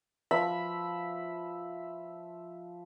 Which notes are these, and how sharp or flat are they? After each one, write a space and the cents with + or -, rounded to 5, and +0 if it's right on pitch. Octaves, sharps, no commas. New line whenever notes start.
F3 +0 E5 +0 B5 +0